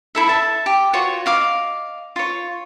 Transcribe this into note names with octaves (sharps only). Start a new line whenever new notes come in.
E4 A4 E5
E5 A5
G4
F4 F#4 C#5
D#5 F5 D6
F4 C#5